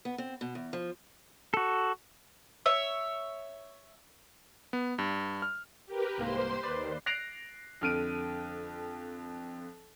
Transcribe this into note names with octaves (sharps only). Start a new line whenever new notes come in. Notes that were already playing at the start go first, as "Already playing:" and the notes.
B3
C4
B2
E2
F3
F#4 A4
C#5 E5
B3
G2
F6
G4 A#4 B4
C2 G#2 A#3 C5 C6
D#2 B4 D5
F#6 A#6 C7 D7 F7
F2 D3 F6 D7 D#7